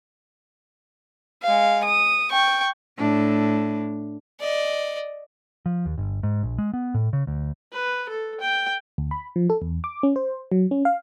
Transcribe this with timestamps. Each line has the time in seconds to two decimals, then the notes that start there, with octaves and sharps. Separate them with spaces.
1.43 G#3 F5
1.85 D#6
2.32 G5 C#6
2.98 A2 D4
4.40 D5 D#5
5.66 F3
5.86 D#2
5.98 G1
6.23 G#2
6.43 A#1
6.58 G#3
6.74 B3
6.94 A2
7.13 C#3
7.27 D2
7.72 B4
8.09 A4
8.40 G5
8.98 D2
9.11 B5
9.36 F3
9.50 A4
9.62 E2
9.84 D6
10.03 C#4
10.16 C5
10.52 F#3
10.71 C#4
10.85 F5